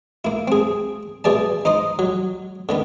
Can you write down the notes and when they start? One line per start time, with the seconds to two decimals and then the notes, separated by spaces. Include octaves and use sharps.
0.25 A#3 E4
0.48 C4 G#4
1.24 B2 E3 G#4 D5 A5
1.65 D#4 C5 D#5 D#6
1.99 F#3
2.69 D3 D#3 B3